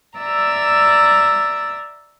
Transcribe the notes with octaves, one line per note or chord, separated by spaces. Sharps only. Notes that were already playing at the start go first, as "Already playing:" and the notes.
D5 E5 A#5 E6